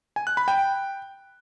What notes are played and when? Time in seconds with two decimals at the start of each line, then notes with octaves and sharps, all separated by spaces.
0.16 G#5
0.27 F#6
0.37 B5
0.48 G5